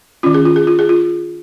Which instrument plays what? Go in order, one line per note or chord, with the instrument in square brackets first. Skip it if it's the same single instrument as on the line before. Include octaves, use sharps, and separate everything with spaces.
[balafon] D#3 C#4 F4
G#4
F4
G#4
F4
G#4
F4